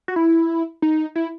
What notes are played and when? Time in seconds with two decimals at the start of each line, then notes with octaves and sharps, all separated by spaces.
0.08 F#4
0.16 E4
0.82 D#4
1.15 E4